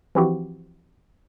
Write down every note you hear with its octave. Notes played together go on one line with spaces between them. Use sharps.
E3 F3 C4 E4 F#4 G4